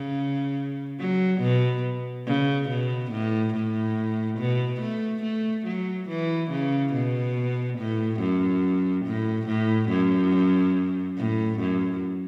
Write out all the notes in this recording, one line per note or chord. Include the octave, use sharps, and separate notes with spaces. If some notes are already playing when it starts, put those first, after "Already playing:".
Already playing: C#3
F#3
B2
C#3
B2
A2
A2
B2
A3
A3
F#3
E3
C#3
B2
A2
F#2
A2
A2
F#2
A2
F#2